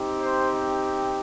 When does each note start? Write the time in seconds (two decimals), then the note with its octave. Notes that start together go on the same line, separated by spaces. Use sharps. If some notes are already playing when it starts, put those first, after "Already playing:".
Already playing: C4 D#4 G4
0.21 C5